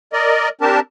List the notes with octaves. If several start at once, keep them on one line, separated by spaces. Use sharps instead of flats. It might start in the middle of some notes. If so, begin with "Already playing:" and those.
A#4 D5 D#5
C4 D4 G4 A#4 A5